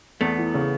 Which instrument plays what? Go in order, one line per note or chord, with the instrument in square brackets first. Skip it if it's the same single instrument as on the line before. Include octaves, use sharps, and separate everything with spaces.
[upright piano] E2 [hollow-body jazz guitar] A3 B3
[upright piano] E3
C#3